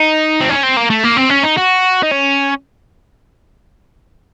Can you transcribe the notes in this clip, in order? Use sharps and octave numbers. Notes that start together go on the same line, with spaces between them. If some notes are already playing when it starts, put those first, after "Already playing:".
Already playing: D#4
C4
C#4
C4
A#3
A3
A#3
C4
C#4
D#4
F#4
D#4
C#4